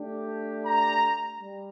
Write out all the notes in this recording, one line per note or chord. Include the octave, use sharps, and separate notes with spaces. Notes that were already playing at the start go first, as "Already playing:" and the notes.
Already playing: A3 D4 G4
A#5
G3